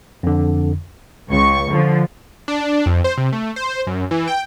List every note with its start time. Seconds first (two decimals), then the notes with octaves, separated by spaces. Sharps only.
0.23 F2 D3
1.30 C#2 C#6
1.71 D3 F3
2.48 D4
2.86 F2
3.04 C5
3.18 C3
3.33 A3
3.56 C5
3.87 F#2
4.11 E3
4.28 G5